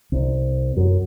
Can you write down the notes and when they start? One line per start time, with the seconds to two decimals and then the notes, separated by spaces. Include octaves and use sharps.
0.12 C2
0.77 F#2